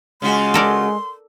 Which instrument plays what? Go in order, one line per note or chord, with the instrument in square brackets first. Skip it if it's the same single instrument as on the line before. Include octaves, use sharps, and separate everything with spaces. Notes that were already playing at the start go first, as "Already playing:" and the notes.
[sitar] C#3 F4 F#4 [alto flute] G#3 [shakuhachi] C6
[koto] A4 A#4 D5